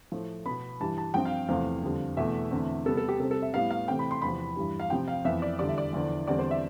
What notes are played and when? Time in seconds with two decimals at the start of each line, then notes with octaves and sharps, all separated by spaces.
0.12 A2 F3 A3
0.46 B2 B3 B5
0.80 G2 E3 G3 A5
0.98 A5
1.14 G2 F3 C4 G5
1.25 F5
1.48 E2 C3 F3 A3 C4 F5
1.83 F2 D3 G3 C4
2.17 E2 B2 A3 E5
2.51 E2 D3 A3 C4
2.85 C3 G3 B3 A4
2.97 A4
3.08 G4
3.20 C3 G3 C4 A4
3.31 A4
3.42 E5
3.54 A2 G3 B3 F5
3.71 F5
3.88 C3 E3 A3 C4 G5
3.99 B5
4.11 C6
4.22 E2 C3 F3 B5
4.56 G2 E3 G3
4.80 F5
4.90 C3 F3 C4 G5
5.08 F5
5.25 F2 E3 B3 E5
5.42 D5
5.59 E2 D3 G3 D5
5.69 E5
5.78 D5
5.93 E2 D3 F3
6.28 E2 D3 G3 C4 D5
6.39 C5
6.51 E5